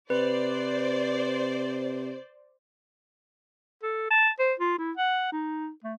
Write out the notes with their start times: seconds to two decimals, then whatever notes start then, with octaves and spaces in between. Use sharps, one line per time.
0.10 C3 B4 C5 D5
3.83 A4
4.11 A5
4.39 C5
4.60 F4
4.78 E4
4.97 F#5
5.32 D#4
5.84 A3